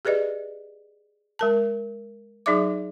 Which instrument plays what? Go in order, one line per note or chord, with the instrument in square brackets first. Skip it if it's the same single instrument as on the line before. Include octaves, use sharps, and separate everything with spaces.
[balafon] G4 G#4 B4 D5 D#5
G#3 A#4 A5
F#3 D#4 G#4 D5 E5 D6